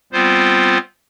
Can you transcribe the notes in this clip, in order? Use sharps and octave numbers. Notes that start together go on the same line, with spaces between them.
G3 B3 C4 F4 C5